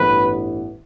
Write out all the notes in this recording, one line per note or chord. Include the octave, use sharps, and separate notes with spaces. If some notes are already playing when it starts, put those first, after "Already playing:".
Already playing: A1 G2 E3 B3 B4